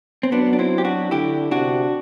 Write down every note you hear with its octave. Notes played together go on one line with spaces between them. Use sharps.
C4
F#3 B3 D4
D4
C4 E4
G4
D4 F#4
D3 E4 G4
C3 D4 F#4